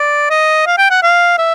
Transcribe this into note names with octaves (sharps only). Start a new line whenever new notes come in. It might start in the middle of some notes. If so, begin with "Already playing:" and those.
Already playing: D5
D#5
F5
G5
F#5
F5
E5